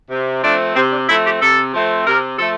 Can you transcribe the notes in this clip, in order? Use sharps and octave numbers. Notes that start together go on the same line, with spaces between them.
C3
F3 A3 C4 D4
C3 C4
D4
F3 A3 C4 E4
G4
C3 A4
F3 A3 C4
C3 A#4
F3 A3 A4